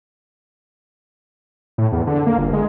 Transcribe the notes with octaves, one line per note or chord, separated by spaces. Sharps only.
A2
E2
D3
A#3
G1
G#3